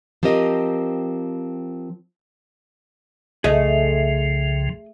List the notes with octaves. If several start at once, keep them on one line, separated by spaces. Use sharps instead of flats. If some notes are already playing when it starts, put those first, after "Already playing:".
F3 C4 G4 A#4 D#5
C2 C#3 F3 A3 G#4 D#5